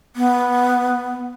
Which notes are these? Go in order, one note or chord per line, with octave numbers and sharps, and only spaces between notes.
B3